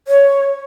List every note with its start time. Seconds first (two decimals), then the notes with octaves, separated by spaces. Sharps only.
0.08 C#5